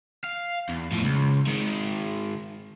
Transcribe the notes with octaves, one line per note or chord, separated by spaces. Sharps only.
F5
E2
A2 F3
C#2
D#3 G#3